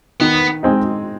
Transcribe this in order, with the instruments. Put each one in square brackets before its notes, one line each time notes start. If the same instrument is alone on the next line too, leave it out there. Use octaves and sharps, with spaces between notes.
[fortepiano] D#3 [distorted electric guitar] B3
[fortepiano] G#3 C4 D#4